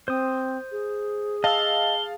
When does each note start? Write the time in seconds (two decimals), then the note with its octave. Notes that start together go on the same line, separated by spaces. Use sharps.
0.08 C4 C5 D#6
0.72 G#4
1.44 D#5 F5 A5 E6 G7